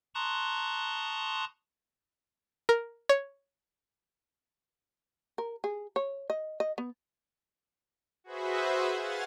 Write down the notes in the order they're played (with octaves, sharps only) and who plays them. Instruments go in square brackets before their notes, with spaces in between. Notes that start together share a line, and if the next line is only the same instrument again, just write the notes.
[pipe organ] A5 A#5 C6 C#6 D#6 F#6
[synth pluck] A#4
C#5
[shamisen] A#4
G#4
C#5
D#5
D#5
B3
[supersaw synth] F#4 G#4 B4 C5 E5
F5 F#5 G#5 C6 A6